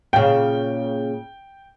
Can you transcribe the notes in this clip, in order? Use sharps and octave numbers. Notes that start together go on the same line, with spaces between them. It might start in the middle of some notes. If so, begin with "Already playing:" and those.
A#2 C#3 G5